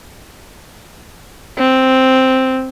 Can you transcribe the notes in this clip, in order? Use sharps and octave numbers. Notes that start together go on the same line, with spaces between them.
C4